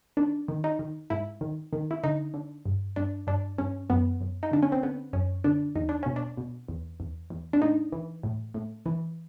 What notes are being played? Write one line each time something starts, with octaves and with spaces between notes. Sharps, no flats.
D#3 D4
D#3
D#4
D#3
G#2 E4
D#3
D#3
E4
D3 D#4
D3
G2
G2 D4
G2 D4
G2 C#4
F#2 B3
F#2
D#4
D3 D4
C#4
C4
D3 B3
F#2 C#4
D3 D4
E2 D#4
D4
B2 C#4
D4
B2
E2
E2
E2
D4
A2 D#4
E3
A2
A2
E3